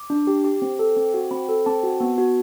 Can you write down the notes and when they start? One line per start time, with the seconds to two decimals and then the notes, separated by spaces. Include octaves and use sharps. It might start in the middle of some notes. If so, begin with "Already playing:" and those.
Already playing: D6
0.10 D4
0.27 G4
0.44 G4
0.62 C4
0.79 A4
0.96 C4
1.14 F#4
1.31 C4 B5
1.49 A4
1.66 C4 A5
1.83 F#4
2.00 B3
2.18 F#4